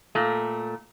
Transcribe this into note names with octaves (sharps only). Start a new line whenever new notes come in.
A#2 A3